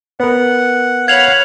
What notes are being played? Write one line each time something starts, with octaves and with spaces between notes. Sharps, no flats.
B3 A#4 F#5
C#5 F5 F#5 B5 G#6 F7 F#7